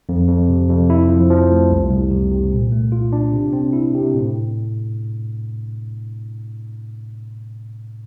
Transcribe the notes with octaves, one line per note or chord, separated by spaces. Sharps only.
F2
F2
C3
F2
E4
F3
F3
A3
C2
C2
C3
C3
A#2
A3
F4
D4
C3
C4
E4
C3
A2